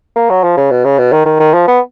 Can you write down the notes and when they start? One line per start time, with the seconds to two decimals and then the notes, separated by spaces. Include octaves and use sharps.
0.16 A#3
0.30 F#3
0.44 F3
0.57 C#3
0.71 B2
0.85 C#3
0.99 B2
1.13 D#3
1.26 D#3
1.40 D#3
1.54 F3
1.68 B3